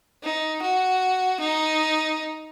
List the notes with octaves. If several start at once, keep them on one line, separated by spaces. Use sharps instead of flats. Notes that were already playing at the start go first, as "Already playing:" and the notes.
D#4
F#4
D#4